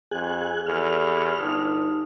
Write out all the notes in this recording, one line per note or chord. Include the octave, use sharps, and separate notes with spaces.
F2 G#4 G#5 F#6
E2 G4 A4 F6
G1 D#4 A5 D#6